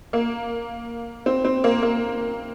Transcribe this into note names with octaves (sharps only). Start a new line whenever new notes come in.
A#3
C4
C4
A#3
A#3